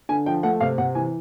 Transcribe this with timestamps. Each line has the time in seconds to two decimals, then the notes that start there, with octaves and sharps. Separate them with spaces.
0.09 D3 G#5
0.26 F3 G5
0.43 A3 F#5
0.60 C3 F5
0.78 C3 F#5
0.95 E3 G#5